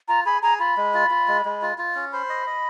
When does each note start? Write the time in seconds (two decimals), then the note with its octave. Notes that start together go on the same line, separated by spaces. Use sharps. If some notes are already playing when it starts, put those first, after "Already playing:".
0.08 F4 A#5
0.26 G#4 B5
0.42 G#4 A#5
0.59 F4 B5
0.77 G#3
0.94 F4
1.10 F4
1.28 G#3
1.45 G#3
1.62 F4
1.78 F4
1.95 C#4
2.13 C5 B5
2.29 D#5
2.47 D#5